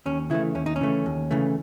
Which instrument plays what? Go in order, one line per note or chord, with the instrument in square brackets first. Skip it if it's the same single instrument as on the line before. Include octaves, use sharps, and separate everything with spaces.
[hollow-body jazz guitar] D#2 C#4
C#3 E3 A3 E4
D#2 C#4
D#4
C#4
C#3 E3 A3
D#2
C#3 E3 A3